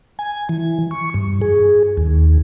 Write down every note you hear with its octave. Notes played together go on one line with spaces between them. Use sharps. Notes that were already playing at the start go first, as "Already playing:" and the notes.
G#5
E3
C#6
G2
G#4
D#2